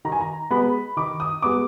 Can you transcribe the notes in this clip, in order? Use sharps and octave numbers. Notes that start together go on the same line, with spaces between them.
D#3 A#5
G#5
A#5
G#3 B3 B5
D#3 D6
D#6
G#3 B3 D6